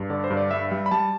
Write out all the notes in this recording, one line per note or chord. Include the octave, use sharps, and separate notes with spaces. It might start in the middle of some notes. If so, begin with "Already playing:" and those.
Already playing: G2
D3 D5
C5
G2
D5
G3 E5
G3
B5
G3 A5